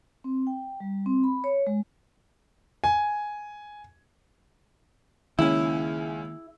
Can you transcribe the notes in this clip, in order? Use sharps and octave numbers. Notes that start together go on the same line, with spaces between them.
C4
G5
G3
C4
B5
C#5
G#3
G#5
C#2 D#3 A#3 C#4 E4